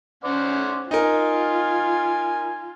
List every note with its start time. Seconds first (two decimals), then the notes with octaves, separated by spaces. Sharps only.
0.24 C#4 C5 D5 F#5
0.91 D#4 F4 A#4 G#5